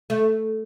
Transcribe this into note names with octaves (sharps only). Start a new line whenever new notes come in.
A3